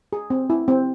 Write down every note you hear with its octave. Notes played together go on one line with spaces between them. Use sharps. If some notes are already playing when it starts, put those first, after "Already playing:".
G#4
C4
E4
C4